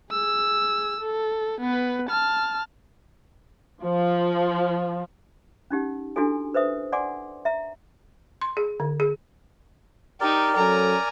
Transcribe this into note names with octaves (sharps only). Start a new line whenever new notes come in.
G#4 E6
A4
B3 B4
A5 F6
F3
C#4 D#4 G4 F#5
D4 E4 F#4 G4 A4 G#5
B4 C5 E5 D#6
D5 F#5 G#5 C6 D6
E5 A#5
C6
G#4
D3
G#4
D#4 G4 A#4 D5
F#3 C#4 A4 G#5 A#5